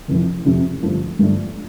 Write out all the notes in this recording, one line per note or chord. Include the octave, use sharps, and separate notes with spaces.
F1 F2 E3
F1 F2 C3
G2 D3 F3 A3
G1 G2 F3 A3 D4